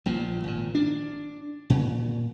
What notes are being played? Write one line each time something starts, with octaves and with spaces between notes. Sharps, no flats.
A#1 A#2 F3
G#1 A#2
D4
A#2